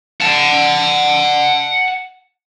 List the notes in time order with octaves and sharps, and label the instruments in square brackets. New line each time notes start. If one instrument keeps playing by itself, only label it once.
[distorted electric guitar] F#5 A5